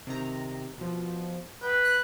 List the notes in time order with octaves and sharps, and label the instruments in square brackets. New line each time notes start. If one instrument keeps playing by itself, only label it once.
[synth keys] C3 D#3 A#5
B2 F3
[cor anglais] B4 [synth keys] G5
[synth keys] F#6